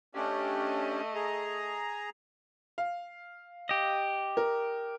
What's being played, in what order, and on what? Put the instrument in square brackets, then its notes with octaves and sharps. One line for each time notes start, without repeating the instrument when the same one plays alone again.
[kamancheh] A3 D#5 [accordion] C#4 D4 G4
[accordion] G#4 A#5
[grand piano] F5
[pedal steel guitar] G4 D#5
[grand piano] A#4